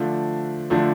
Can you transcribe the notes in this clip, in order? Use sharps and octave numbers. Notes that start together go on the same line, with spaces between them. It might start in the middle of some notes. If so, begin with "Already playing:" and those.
Already playing: D3 F3 A3 D4
D3 F3 A3 D4